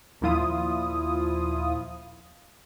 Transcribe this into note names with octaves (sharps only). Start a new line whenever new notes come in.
D#2 A#2 F3 E4 F4 D#6